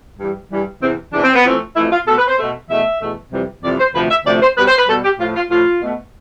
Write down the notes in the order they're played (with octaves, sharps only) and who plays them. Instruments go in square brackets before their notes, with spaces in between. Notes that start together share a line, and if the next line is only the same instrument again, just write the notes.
[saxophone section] G2 E3 G3
G2 E3 G3
E2 C3 E3 C4
E2 C3 E3 D4
C4
B3
F2 E3 A3 C4
F2 E3 A3 E4
F4
B2 A3 A4
B4
C5
B2 A3
E2 B2 A3 E5
E2 B2 A3
F2 C3 E3 G3
F2 C3 E3 G3 D5
C5
D2 C3 F3 A3 B4
E5
D2 C3 F3 A3 D5
C5
B2 G3 B4
C5
B4
B2 G3 A4
G4
A2 F3 A3 F4
F4
A2 F3 A3 F4
B2 A3